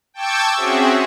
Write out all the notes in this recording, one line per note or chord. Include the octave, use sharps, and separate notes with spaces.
G5 A5 C#6 D6 E6 G#6
C4 C#4 F#4 G#4 E5